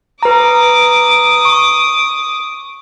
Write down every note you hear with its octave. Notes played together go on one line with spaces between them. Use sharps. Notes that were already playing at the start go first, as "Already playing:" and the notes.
B4 A#5 D6 D#6
C#6